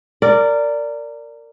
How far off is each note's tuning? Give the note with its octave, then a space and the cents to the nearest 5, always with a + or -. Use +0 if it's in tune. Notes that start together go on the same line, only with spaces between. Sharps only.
A#4 -20 D5 -5